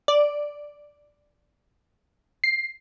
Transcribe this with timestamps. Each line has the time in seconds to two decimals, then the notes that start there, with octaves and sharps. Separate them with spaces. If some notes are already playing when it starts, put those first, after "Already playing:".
0.08 D5
2.44 C7